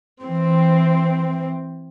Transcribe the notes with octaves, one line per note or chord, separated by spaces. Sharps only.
E3 C4